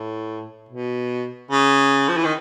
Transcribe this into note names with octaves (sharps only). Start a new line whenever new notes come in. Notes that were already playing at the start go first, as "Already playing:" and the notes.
Already playing: A2
B2
C#3
F3
E3
D#3